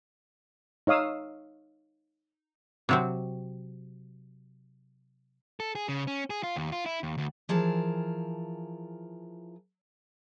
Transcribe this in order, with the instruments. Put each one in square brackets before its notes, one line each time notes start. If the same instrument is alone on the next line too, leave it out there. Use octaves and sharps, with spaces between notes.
[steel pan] D#4 C#5 F5 D#6 E6
[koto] C3 F#3 C4
[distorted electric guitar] A4
G#4
C#3
C#4
G#4
F4
D#2
F4
E4
D#2
D2
[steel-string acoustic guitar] E3 F3 G#4 A#4 A5